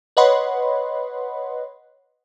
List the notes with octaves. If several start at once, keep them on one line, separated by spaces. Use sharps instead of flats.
B4 C#5 D#5 F#5 B5 C6